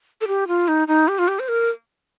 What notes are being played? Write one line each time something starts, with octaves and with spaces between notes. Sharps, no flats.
A4
G4
F4
D#4
D#4
G4
F4
G4
C5
A#4